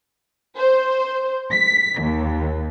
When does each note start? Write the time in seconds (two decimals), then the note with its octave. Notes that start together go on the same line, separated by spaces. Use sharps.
0.58 C5
1.52 B6
2.02 D#2